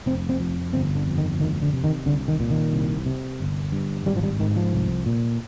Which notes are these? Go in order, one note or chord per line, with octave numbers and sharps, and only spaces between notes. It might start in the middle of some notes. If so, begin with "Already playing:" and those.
F1 C4
C4
F2
G1 C4
D3
F2
D#3
D2 D#3
D3
C3
D#3
C2 D3
D#3
A#2
D#3
C2
C3
G1
G2
G#1 G3
F3
G3
G#2 D#3
F3
C2
A#2